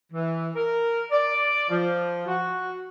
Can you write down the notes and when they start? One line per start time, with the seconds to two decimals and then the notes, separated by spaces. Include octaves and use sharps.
0.13 E3
0.56 A#4
1.11 D5
1.70 F3
2.27 F#4